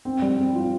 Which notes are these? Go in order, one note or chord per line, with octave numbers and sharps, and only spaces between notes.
C4
G3
C4
F4